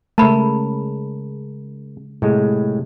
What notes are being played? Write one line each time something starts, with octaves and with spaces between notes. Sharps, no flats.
C#3 G#3 A3 A#4 A5 B5
A2 C3 G#3